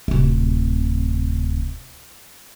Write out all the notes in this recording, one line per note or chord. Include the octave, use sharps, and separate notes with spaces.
D1 C3